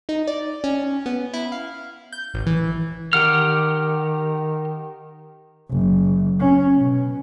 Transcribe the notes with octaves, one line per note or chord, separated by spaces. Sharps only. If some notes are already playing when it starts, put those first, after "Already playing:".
D#4
D5
C#4
B3
E4
F5
G6
A1
E3
D#3 G4 F#5 F6
F#1
C#4
B2